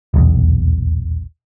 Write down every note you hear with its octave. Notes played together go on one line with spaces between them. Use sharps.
D#1 B1 E2